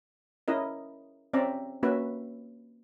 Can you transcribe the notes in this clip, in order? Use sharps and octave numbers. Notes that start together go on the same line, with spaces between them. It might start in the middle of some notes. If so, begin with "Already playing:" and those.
C#4 E4 A#4 D#5
C4 C#4 D5 E5 A#5
A#3 C#4 F#4 B4 E5